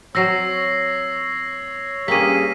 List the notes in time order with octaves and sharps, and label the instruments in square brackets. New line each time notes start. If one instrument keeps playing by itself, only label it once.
[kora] F#3 C4 [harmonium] C#5 [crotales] E6 A#6 C7
[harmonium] G2 G4 G#4 [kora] A#3 C#4 [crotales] B6 D#7